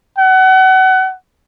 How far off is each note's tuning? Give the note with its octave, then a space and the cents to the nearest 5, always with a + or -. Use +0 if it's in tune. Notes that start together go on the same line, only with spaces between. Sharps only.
F#5 +30